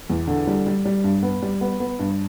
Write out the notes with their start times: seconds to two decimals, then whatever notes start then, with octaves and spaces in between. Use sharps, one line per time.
0.10 E2
0.27 D3
0.47 G3
0.67 G3
0.85 G3
1.04 G2
1.23 B3
1.42 G3
1.61 B3
1.80 B3
1.99 G2